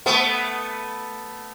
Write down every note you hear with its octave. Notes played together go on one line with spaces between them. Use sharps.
A3 B3